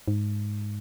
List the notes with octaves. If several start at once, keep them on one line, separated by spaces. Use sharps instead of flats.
G#2